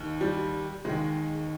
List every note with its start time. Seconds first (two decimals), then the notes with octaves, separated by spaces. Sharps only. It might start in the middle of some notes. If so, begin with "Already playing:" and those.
Already playing: D#2 D#3
0.21 G3
0.85 D#2 D#3 G#3